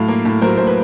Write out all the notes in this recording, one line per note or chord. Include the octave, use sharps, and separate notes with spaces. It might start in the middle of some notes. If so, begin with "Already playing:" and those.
Already playing: A2 F#3 F5
A#3
A2
F#3 A#4 C5
A2 C5
B4